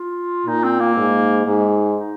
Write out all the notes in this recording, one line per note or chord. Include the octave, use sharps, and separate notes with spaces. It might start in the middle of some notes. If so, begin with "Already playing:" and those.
Already playing: F4
A#2 D#4
C4
A#3
G#2
G#2
D#4